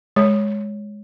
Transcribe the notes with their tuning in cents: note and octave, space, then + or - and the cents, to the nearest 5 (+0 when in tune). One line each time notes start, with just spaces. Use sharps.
G#3 +0 C#5 +0